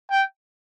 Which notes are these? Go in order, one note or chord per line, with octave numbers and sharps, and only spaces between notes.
G5